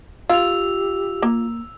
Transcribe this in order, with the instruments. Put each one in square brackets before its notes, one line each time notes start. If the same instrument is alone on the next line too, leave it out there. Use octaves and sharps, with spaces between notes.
[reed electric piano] F4 [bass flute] G4 [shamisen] F5 [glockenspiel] E6 F7
[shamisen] A#3